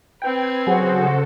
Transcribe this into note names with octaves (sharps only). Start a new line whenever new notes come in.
C4 B4 G5 G#6
C#3 F#3 F#4 G#4 A4 C5 F#5